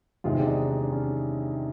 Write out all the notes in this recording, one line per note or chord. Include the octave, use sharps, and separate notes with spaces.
E2 C3 D#3 G#3 F4
D4
D#4
D4
D4
C#4